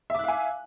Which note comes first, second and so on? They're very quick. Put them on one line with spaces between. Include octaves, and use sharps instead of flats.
E5 D6 F#6 F5 G#5